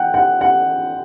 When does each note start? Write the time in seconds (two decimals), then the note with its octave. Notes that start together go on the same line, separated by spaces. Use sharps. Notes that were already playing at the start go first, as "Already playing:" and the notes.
Already playing: F#5 G5
0.14 F#5
0.41 F#5